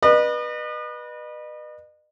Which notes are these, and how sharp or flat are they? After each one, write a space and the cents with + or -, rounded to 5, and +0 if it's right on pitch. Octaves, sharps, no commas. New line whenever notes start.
B4 -20 D#5 -40